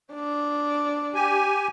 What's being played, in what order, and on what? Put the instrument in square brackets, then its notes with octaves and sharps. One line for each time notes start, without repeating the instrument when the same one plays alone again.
[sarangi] D4
[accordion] G4 G#5